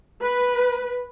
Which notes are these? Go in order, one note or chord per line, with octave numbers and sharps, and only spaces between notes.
B4